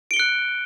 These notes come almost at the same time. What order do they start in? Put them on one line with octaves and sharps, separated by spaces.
D7 G7 C#7 F#6